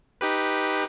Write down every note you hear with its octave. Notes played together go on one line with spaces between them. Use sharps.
D#4 G4 B4